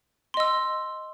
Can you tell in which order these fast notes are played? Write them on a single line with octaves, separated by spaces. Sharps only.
C6 D#5 E6